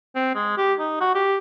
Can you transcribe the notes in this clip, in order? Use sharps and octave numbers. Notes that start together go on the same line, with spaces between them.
C4
G#3
G4
D#4
F#4
G4